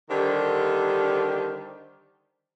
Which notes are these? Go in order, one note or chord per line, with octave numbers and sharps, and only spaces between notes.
D3 D#3 G3 G4 C5